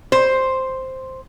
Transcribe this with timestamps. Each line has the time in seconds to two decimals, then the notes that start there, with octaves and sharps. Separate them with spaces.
0.12 C5